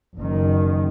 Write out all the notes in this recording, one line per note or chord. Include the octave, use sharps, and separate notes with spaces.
F#1 D#3